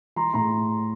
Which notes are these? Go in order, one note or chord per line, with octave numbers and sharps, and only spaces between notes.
E3 A#5 C6
A2 A#5 C6